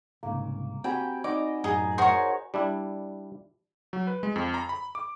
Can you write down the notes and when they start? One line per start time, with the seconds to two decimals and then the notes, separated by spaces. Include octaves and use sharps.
0.23 C2 G#2 C#3 A#3
0.84 C4 F#4 G4 G5 G#5 B5
1.24 C4 D#4 D5 D#5 D6 E6
1.64 F#2 A2 D#4 G#4
1.98 F#4 G#4 A#4 C5 C#5
2.54 G3 D4 E4
3.93 F#3
4.07 B4
4.23 G#3
4.36 F2
4.54 A#5
4.69 B5
4.95 D6